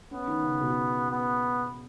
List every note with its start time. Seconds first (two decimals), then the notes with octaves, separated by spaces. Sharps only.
0.11 B3 C#4
0.27 D#3
0.44 C#3
0.61 B2
1.11 B3